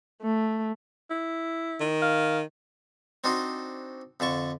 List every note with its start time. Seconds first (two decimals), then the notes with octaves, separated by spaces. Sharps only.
0.22 A3
1.10 E4
1.81 D#3
2.02 F5
3.24 C4 D4 D#4 F#4 C5
4.20 F2 D3 A5 C#6